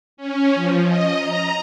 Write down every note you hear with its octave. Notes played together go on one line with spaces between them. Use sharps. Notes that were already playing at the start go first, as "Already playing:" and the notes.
C#4
F3
D#5
A#5